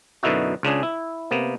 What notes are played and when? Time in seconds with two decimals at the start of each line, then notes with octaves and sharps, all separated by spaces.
0.23 F#2 B2 D3 D#4 E4 F#4
0.63 C#2 C#3 D4 G#4
0.83 E4
1.31 C3 A#3 B3